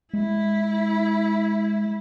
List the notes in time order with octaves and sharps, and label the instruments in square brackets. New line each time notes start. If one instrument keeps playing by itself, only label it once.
[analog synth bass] G#3 [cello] E4